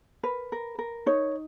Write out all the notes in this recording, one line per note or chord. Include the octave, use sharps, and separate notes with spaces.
A#4 B4
A#4
A#4
D#4 C#5